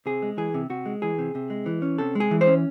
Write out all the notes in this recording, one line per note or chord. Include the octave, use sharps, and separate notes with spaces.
C3 G#4
G#3
E3 G#4
C3
C3 F#4
G#3
E3 G#4
C3
C3
G#3
E3
C#4
C3 A4
G#3 G#4
E3
C5
C#4